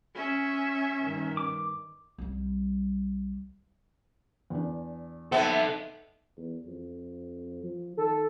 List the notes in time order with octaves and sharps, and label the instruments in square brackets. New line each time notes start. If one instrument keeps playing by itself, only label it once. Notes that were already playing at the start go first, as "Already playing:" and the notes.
[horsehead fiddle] C#4 E5
[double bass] G2 D#3
[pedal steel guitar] D6
[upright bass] C2 G3
[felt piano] E2 D4
[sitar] B3 [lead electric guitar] D#4 A4 [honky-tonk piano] E5
[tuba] E2
F2
F3
[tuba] D#3 [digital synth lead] A4